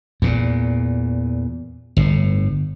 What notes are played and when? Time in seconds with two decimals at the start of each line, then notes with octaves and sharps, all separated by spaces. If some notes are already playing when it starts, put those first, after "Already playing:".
0.22 E2 A#2
1.97 G1 A2